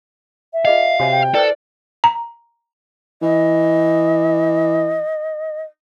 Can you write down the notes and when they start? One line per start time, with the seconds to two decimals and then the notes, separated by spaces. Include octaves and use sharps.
0.53 E5
0.65 F4 G#4 D#5 F5
1.00 C3 F#4 C#5 E5 G#5
1.11 G5
1.34 E4 A4 B4 C5 D5
2.04 A#5
3.22 E3 D#5